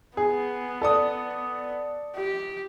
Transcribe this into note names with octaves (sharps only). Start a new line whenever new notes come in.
B3 G#4
A4 D5 D#6
G4